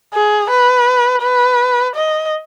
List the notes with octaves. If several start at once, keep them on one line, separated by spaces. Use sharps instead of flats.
G#4
B4
B4
D#5